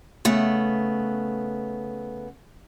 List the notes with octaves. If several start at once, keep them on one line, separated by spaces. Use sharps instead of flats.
C#3 A3 B3